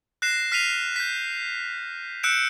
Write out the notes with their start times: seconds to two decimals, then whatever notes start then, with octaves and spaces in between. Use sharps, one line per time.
0.22 F#6 A#6 C7 E7
0.52 F6 B6 C7 D#7 F7
0.96 G6 B6
2.23 E6 F#6 G6 C#7 D7 E7